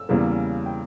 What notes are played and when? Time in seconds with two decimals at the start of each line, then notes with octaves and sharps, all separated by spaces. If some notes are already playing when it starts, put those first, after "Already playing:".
Already playing: E6
0.09 E2 C#3 E3 G3 A#3
0.66 G5